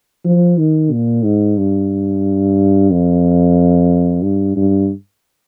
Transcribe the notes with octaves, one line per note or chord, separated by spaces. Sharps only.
F3
D#3
A#2
G#2
G2
F2
G2
G2